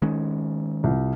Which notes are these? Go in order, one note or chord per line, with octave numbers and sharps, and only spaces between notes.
D#3 G#3 C#4
C2 F4